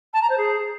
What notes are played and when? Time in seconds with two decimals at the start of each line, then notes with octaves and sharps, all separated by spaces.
0.13 A5
0.21 A#5
0.29 C5
0.38 G#4